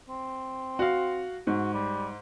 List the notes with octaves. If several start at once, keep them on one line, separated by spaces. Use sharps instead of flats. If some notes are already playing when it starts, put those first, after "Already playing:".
C4
F#4 F5
G#2 F#4
G3